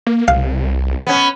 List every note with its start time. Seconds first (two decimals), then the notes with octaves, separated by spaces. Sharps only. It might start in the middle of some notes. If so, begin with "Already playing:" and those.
0.07 A#3
0.28 C2 F5
1.07 B3 C#4